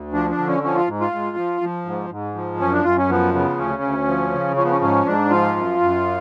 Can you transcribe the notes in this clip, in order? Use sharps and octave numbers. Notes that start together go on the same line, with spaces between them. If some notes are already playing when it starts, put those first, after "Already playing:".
Already playing: D2
F3 D4
D4
D3
C#4
F3 C#4
F4
G#2
F4
G#2
F3
F3
G#2
G#2
F3
F#2 C#4
D4
F#2 F4
C#4
F3 B3
C#3 B3
D2 C#4
D2
F3
C#3
F3 C#4
B3
C#4
G#2 C#4
G#2 D4
F3 F4
F#2
F#2